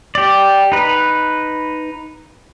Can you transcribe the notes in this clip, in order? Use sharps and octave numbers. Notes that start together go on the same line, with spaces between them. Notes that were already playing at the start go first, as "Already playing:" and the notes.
G4 D5
D#4 B4